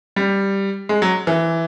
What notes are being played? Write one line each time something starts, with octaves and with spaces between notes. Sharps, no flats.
G3
G#3
F#3
E3